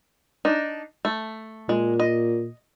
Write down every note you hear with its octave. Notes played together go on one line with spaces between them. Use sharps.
D4 D#4
A3
A#2 G#3
D#5